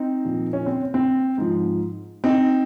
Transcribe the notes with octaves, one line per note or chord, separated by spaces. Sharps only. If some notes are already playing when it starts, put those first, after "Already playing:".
Already playing: C4 D#4
A#2 F3
C#4
C4
C4
G#2 F3
C4 D#4